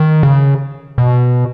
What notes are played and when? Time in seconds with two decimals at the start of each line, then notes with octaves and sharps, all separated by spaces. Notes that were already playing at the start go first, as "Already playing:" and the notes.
Already playing: D#3
0.23 C#3
0.98 B2